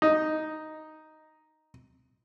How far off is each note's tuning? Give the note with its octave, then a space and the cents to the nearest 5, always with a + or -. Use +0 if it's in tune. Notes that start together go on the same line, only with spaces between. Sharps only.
D#4 +0